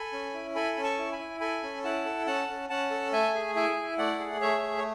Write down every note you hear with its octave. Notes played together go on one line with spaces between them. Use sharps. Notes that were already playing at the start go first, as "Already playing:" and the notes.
Already playing: A4 G#5 B5
C#4
E4
A4 G#5 B5
C#4
A5 C#6
E4
G#5 B5
E4
A4 G#5 B5
C#4
E4 F#5 A5
A4
C#4 F#5 A5
C#4
C#4 F#5 A5
A4
A3 E5 G#5
G#4
E4 E5 G#5
E4
A3 D5 F#5
G#4
A3 C#5 E5
G#4
C#5